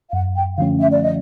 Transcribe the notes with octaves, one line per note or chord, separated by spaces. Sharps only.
F5
F#2 F#5
G5
D3 F3 A3 C#4 F5
E5
D5
D#5